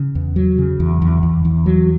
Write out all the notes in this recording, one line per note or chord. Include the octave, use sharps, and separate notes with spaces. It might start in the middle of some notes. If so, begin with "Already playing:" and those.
Already playing: C#3
E2
F#3
C#3
E2
E2
E2
E2
F#3